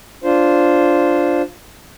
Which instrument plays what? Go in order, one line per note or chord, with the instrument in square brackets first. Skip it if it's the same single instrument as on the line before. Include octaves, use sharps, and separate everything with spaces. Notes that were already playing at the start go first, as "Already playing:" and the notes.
[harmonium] D4 F4 C5